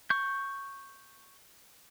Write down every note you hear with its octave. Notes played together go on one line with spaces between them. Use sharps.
C#6 G6